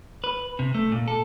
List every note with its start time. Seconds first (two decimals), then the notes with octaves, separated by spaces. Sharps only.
0.24 B4
0.59 C3
0.74 A3
0.92 A#2
1.08 A4